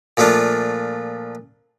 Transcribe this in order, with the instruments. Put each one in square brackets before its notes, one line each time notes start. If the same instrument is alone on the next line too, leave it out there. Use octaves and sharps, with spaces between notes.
[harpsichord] A#2 F3 A3 D4 F4